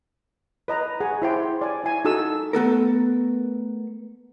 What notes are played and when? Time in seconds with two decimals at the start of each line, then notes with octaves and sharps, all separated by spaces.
0.68 B4 D#5 A#5
1.00 G#4 F#5 G#5
1.22 E4 C5 G5 C6
1.61 D5 G#5
1.84 E4 G#5
2.05 D#4 F#4 A4 E6
2.53 A3 B3 A4 A#4